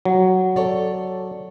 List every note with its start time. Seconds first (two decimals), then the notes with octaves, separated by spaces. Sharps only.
0.05 F#3
0.56 A4 C#5 D5